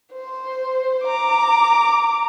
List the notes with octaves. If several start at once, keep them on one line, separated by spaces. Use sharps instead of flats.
C5
A#5 D6